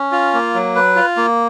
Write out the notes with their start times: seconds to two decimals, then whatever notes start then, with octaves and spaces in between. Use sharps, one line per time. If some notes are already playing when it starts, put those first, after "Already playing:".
Already playing: C#4
0.12 F4
0.34 A#3
0.54 F#3
0.75 B4
0.96 F4
1.17 A#3